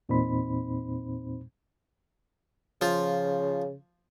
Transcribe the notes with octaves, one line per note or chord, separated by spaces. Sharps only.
E2 A#2 C4 D#4 C5 B5
C#3 F3 F4